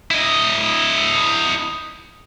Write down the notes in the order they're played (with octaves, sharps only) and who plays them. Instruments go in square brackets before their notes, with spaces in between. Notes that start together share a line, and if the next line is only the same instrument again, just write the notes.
[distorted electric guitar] E4 D#5